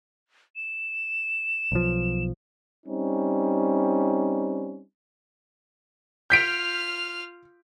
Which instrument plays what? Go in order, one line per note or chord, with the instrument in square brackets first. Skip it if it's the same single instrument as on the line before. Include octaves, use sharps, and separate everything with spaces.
[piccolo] E7
[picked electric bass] B1 F3
[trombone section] G3 C4 C#4 D#4
[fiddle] F4 F6 [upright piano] G6 B6 D7